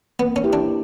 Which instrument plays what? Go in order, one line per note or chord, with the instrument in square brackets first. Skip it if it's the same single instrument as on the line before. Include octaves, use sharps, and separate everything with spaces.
[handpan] A#3 [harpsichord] B3
[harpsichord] C#4
[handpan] E4 G4
[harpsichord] D4